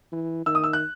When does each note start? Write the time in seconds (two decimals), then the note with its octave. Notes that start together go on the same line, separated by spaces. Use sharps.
0.12 E3
0.46 D#3 E6
0.55 D#6
0.64 E6
0.73 F#6